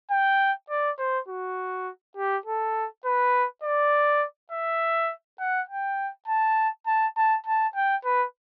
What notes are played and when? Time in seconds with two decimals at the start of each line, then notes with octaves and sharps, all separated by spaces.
0.11 G5
0.70 D5
0.99 C5
1.28 F#4
2.17 G4
2.46 A4
3.05 B4
3.63 D5
4.52 E5
5.40 F#5
5.69 G5
6.28 A5
6.87 A5
7.17 A5
7.46 A5
7.75 G5
8.05 B4